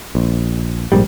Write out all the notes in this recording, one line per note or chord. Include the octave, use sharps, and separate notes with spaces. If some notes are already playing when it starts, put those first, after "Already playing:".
A#1
A#1 G#2 G3